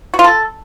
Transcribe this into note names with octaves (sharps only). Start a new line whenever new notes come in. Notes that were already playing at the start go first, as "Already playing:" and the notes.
F#4
F4
A4